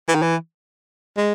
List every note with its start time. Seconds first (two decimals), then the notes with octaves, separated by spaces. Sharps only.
0.08 E3
0.15 D#3
0.22 E3
1.17 G#3